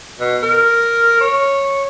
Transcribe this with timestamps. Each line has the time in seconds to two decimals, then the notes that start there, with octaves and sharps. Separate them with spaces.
0.20 B2
0.43 A#4
1.21 C#5